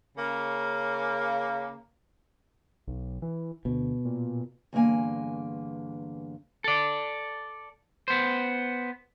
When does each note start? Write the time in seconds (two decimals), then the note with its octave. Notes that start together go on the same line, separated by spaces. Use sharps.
0.18 C#3 A#3
2.88 B1
3.22 E3
3.65 D2 B2
4.05 A#2
4.73 E2 G2 D3 A#3 G#5
6.64 A4 D5
8.08 B3 C5